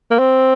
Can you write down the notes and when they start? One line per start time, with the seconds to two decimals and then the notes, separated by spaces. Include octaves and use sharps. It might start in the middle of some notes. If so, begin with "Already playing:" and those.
0.11 A#3
0.19 C4